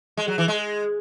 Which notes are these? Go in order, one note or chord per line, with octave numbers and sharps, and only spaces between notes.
G#3
F#3
E3
G#3